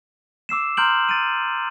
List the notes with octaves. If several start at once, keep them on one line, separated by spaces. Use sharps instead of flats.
D6 E6 C7 E7
A#5 C6 F6 G6 D7 F#7
A6 D7 D#7